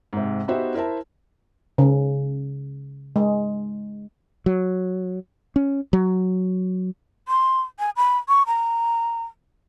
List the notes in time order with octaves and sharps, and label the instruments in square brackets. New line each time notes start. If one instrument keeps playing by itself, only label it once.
[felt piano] G#2 C3
B3 D#4 F#4 G4 C5 E5
E4 A#4 C5 E5 A5
[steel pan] C#3
G#3
[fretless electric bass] F#3
C#4
F#3
[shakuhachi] C6
G#5
B5
C#6
A#5